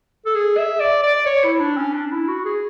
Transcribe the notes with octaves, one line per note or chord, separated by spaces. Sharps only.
A4
G#4
E5
D5
D5
C#5
E4
D4
C#4
D4
D4
E4
F#4
G#4